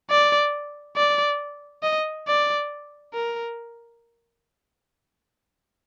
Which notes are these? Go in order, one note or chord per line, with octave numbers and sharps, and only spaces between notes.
D5
D5
D#5
D5
A#4